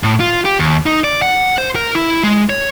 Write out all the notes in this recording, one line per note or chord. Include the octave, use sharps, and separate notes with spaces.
A2
F4
G4
D#2
D#4
D5
F#5
C5
A#4
E4
G#3
C#5